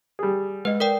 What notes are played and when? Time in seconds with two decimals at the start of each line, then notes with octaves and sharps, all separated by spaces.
0.19 G3 G#4
0.65 G#3 B4 D#5
0.80 A#4 D5 G5